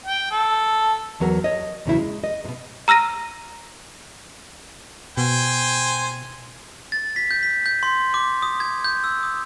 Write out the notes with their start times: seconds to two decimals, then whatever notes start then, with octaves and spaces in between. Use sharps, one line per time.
0.06 G5
0.31 A4
1.20 E2 F#3 A#4 F#5
1.44 C#5 D#5
1.86 E2 A#2 C#3 F#3 E4
1.99 G#3
2.24 D#5
2.45 G#2 B2
2.88 A#5 E6 F6 A#6 D#7
5.17 B2 C5 G5 G#5
6.92 A6
7.16 B6
7.31 G6
7.43 B6
7.66 G6
7.83 C6
8.14 D6
8.42 D#6
8.60 G#6
8.84 G6
9.04 E6
9.23 D#6